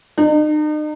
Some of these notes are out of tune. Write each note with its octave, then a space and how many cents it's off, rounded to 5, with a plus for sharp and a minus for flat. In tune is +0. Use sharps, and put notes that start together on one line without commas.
D#4 -40